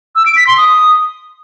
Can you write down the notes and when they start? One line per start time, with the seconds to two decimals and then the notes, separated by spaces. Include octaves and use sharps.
0.16 E6
0.26 D7
0.36 B6
0.47 C6
0.57 D#6